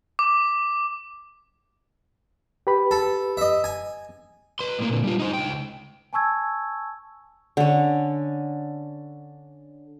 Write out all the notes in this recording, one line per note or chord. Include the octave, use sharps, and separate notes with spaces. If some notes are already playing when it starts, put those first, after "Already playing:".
D6
G4 B4 B5
A4
D#5 E5
G#5
B4 C6
A2 A#3
A#2 D3
G3 F4
D#4 C5
C#2 G5
G#5 A5 C#6 E6 G#6
D3 C#4